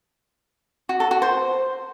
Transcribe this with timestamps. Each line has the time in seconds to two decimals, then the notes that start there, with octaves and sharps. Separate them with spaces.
0.89 F#4
1.00 A4
1.11 F#4
1.22 C5